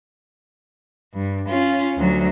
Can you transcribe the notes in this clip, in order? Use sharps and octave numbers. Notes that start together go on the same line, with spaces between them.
G2
C#4 F4
D2 F#3